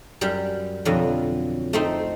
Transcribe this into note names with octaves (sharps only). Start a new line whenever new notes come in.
F#2 G3
F2 B2 D3 F#3
A3 C4 D#4